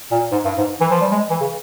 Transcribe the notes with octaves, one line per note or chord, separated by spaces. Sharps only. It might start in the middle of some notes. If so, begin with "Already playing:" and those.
A#2
G#2
G2
G#2
E3
F3
G3
G#3
E3
C#3